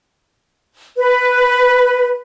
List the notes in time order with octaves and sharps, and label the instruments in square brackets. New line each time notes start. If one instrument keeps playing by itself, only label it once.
[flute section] B4